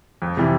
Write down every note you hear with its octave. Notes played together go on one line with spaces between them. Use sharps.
F2
C3 E3 G3